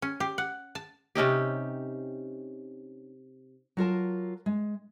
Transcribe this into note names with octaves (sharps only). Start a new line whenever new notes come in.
C#4
G4
F#5
A5
C3 C#4 D#4 G4
F#3 F4 A#4 A5
G#3